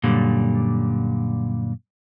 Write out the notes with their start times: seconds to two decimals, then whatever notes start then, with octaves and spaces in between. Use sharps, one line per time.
0.03 F#2 A#2 D3 G3